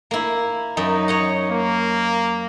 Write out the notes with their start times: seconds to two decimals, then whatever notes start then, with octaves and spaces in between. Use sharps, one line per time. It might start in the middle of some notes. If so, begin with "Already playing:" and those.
0.11 A#3 E4
0.77 F#2 D#4
1.08 C#5 D#5 F#5
1.51 A#3